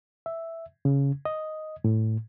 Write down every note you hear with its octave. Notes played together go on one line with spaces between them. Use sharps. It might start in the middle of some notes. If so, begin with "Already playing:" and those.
E5
C#3
D#5
A2